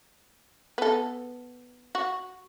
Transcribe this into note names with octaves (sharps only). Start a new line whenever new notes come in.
B3 A4
F#4